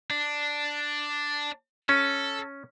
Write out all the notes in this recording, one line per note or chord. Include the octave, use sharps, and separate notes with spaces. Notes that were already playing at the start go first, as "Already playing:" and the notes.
D4
C#4 A4